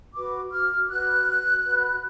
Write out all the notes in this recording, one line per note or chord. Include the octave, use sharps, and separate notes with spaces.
F#4 B4 D6
F6
F#4 B4 F#6
F#4 B4